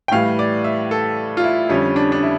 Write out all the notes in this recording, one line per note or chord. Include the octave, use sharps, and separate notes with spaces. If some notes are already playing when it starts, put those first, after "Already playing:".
G5
A2 E3 G3 F5
D5
E5
A4
F4
E4
F2 D3 G3 C#4
D4
D4
E4